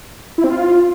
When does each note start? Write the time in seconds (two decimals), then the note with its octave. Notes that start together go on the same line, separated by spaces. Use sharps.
0.38 E4
0.44 C4
0.50 F4